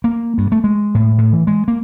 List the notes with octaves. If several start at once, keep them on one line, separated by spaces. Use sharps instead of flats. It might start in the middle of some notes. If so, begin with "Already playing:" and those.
A#3
G2
A3
G#3
A2
A2
E3
G#3
A#3